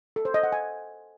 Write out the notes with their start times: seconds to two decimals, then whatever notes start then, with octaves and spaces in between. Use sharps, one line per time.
0.16 A4
0.25 C5
0.34 D#5
0.43 F#5
0.52 G#5